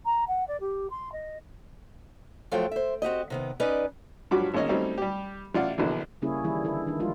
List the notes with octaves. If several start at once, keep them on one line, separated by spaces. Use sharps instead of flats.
A#5
F#5
D5
G4
C6
D#5
F3 F#3 A3 F4 G5
C5 E5
C4 F#4 G4 D#5
C3 D#3 B3
C#4 D#4 B4 D5 D#5
G2 F3 F#3 F#4 D6
G#1 A#3 C#4 D#5
F#3 G3 A3 C4 C#4 D#4
G3 G4
A1 F4 D5 F#5
A#1 B2 D3 E3
C#3 G3 A#3 C#4 E4 G#4
D#3 E3 G3 E4 G#4
D3 E4 A4
D#3 D4
F3 G3 G#3 E4 F4